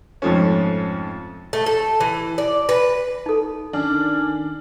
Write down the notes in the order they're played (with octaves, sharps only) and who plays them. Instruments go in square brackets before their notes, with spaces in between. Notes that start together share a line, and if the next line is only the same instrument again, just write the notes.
[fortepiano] F2 G#2 F3 A3 C#4
[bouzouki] A3
A4
E3
D5
B4
[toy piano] D#4 A4
[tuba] D#3 [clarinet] C#4 [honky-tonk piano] D4